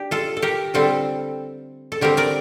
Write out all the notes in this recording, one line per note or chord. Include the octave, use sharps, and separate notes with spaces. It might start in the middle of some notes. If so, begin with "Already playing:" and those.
Already playing: D4 G4
F4 A4
A4
G4 A#4
D3 G3 C4 F4 A4
A4
D3 G3 C4 G4 A#4
A#4 D5